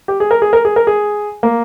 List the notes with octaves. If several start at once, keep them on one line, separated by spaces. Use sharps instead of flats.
G4
G#4
A#4
G#4
A#4
G#4
A#4
G#4
A#3